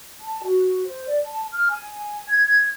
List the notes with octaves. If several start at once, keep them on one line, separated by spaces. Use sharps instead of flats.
A5
F#4
C5
D5
A5
F6
G#5
G#6